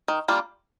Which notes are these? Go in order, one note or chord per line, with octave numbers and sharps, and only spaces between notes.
D#3
G3 A#3 D4 F4